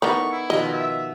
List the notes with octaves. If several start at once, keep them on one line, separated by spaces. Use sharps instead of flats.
E3 B3 D#4 A4 A#4 B5 C#6
E4
B2 D#3 F3 D#5
E5